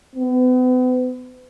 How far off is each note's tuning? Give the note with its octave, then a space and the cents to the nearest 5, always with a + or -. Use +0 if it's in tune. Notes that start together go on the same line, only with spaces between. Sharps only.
B3 +40